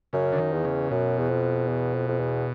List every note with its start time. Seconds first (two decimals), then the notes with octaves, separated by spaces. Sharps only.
0.13 F#2 C#3
0.32 D3
0.38 D#3
0.52 E2
0.65 C#3
0.91 F#2 B2
1.18 E2
1.30 F2
1.68 E2
1.94 F2
2.08 F2
2.20 E2